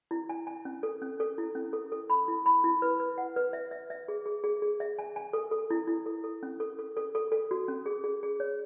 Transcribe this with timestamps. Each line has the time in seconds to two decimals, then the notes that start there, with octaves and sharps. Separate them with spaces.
0.11 E4
0.29 G#5
0.47 G#5
0.65 C#4
0.83 A4
1.02 C#4
1.20 A4
1.38 E4
1.55 C#4
1.73 A4
1.92 A4
2.10 B5
2.28 E4
2.46 B5
2.64 E4
2.82 B4
3.00 B4
3.18 F#5
3.36 B4
3.53 E5
3.71 E5
3.90 E5
4.08 G#4
4.26 G#4
4.44 G#4
4.62 G#4
4.80 E5
4.99 G#5
5.16 G#5
5.33 A4
5.51 A4
5.70 E4
5.87 E4
6.06 A4
6.24 A4
6.43 C#4
6.60 A4
6.79 A4
6.97 A4
7.15 A4
7.32 A4
7.51 F#4
7.68 C#4
7.86 G#4
8.04 G#4
8.23 G#4
8.40 C#5